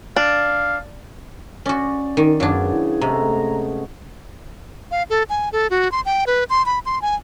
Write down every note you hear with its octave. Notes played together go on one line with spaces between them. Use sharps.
D4 F5
C#4 F#4 D5
D#3 D#4
F#2 C#3 F#3 B3 D4 G#5
E4
C3 G#3 A3 A#5
F5
A4
G#5
A4
F#4
C6
G5
B4
C6
B5
C6
G#5